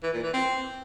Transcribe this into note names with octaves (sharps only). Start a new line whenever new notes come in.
E3
A#2
E3
C4